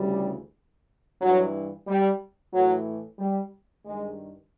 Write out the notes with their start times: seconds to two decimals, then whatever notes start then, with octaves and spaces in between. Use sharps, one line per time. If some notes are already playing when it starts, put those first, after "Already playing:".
Already playing: D2 C#3 E3 G3
1.21 G2 E3 F#3
1.88 G3
2.53 A2 E3 F#3
3.19 G3
3.85 G2 D#3 G#3